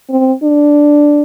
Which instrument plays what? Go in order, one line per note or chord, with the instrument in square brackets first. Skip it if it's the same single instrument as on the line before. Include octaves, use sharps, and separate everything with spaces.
[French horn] C4
D4